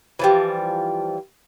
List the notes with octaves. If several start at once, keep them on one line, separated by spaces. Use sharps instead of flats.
E3 F3 G3